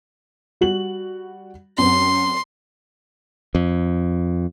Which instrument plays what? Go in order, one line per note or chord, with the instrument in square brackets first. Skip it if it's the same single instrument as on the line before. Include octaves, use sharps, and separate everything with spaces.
[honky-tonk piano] G3 F#4 F#7
[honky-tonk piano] F#2 F#3 C4 [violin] C6
[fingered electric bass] F2